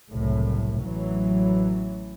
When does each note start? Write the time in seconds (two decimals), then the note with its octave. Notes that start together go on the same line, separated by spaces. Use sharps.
0.10 F#1 C2 A2
0.81 A1 E3 F#3